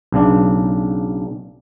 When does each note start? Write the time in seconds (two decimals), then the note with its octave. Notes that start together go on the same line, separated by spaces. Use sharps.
0.12 B1 C#3 D4